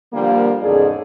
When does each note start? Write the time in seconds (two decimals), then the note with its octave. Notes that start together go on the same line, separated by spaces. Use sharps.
0.13 D3 F3 G3 A#3
0.62 E2 G#2 C#3 G#4 A4 D5